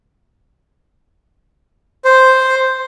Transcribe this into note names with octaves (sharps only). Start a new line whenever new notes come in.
C5